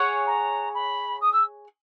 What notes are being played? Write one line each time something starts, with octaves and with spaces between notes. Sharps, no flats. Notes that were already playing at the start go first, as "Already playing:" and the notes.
Already playing: G#4 C#5 F#5
A#5
B5
D#6
E6